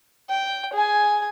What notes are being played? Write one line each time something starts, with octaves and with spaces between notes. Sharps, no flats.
G5
G#4 G#5